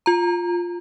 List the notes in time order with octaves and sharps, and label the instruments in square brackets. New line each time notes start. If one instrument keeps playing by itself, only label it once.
[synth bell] F4 A#5